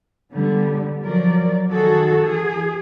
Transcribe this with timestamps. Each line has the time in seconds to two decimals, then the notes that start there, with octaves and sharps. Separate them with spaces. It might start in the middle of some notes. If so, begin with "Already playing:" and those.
0.32 D3 G3 B3
1.03 F3 F#3 A#4 D5
1.70 D#3 F#4 G#4 A4
2.20 E3 G#4